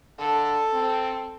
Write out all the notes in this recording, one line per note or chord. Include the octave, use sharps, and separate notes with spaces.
D3 A4
C4